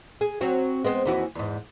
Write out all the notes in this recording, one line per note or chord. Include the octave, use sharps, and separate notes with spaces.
G#4
F#3 C4 F#4
G#3 B3 C4
D#2 E3 F#4
E2 G#2